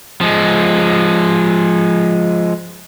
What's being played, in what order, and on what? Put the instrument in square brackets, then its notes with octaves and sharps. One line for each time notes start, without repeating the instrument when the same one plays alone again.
[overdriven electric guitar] F3 G#3